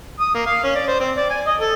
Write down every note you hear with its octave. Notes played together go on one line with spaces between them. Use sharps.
D#6
A#3
F5
C#4
D5
C5
C4
D5
G#5
D#5
A4